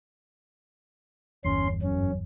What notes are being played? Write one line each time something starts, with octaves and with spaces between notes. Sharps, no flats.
G1 E2 C#4 C6
F#2 C#4